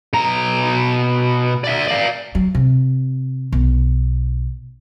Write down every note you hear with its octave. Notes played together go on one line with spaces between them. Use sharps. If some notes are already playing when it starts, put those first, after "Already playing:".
B2 A#5
D5 E5
D5 F5
F#3
C3
B1